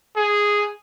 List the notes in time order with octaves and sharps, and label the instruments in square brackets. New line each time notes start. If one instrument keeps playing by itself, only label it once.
[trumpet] G#4